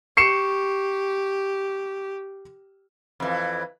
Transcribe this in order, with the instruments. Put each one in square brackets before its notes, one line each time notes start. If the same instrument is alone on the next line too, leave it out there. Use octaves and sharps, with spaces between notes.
[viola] G4 [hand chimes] C#6 [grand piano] C7 C#7 E7
[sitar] F2 E3